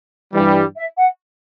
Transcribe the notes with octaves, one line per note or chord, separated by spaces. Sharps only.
G2 E3 G3
E5
F#5